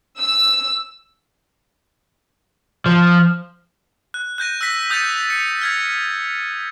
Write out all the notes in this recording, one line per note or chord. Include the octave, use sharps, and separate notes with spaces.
E6
F3
F#6
F#6 G6 A#6 D#7
E6 F#6 A#6 B6
D#6 G6 A6 C#7 D#7
C#7
F6 G#6 B6